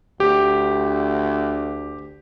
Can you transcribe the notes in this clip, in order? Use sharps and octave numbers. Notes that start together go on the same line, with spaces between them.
D2 G4